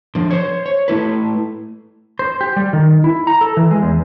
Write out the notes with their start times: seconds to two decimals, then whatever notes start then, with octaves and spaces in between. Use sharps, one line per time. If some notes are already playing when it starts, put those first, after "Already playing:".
0.15 D3 F3
0.31 C5 C#5
0.66 C#5
0.88 A3 E4 B4
2.19 C5
2.41 G4
2.56 G3
2.73 D#3
3.04 E4
3.27 A#5
3.41 A4
3.57 E3
3.71 G#3
3.82 E2